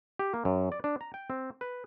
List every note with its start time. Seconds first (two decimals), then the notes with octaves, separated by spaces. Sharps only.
0.19 G4
0.34 A#3
0.45 F#2
0.72 D5
0.84 D4
1.01 A#5
1.14 G5
1.30 C4
1.61 B4